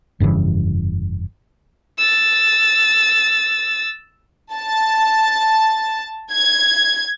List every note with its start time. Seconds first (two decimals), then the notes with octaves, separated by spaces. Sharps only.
0.20 F1 G2 C#3 E3
1.98 E6 A6
4.53 A5
6.31 G#6